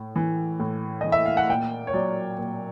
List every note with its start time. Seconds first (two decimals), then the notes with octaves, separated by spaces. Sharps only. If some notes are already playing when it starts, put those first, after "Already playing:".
Already playing: A2
0.16 E3
0.60 A2
1.01 E3 D#5
1.12 E5
1.26 F5
1.37 F#5
1.49 A#2 G5
1.87 C#5
1.93 F#3 D5
2.39 A#2